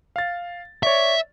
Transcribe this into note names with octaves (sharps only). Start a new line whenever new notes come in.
F5 A6
C#5 D5 E5 C#6